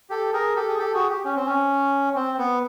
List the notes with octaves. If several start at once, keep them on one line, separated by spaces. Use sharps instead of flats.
G4 A4
G#4 A#4
G4 A4
G#4
G4 A4
F#4 G#4
G4
C#4
C4
C#4
C4
B3